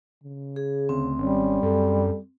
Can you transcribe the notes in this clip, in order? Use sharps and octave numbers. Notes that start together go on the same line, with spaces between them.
C#3
G#4
D2 C4
G#1 G3 C#4
F#2 A4